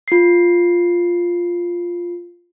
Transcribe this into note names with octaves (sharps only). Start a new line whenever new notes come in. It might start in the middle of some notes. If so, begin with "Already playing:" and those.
F4 C7